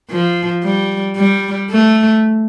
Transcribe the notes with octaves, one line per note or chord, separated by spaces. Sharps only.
F3
G3
G3
A3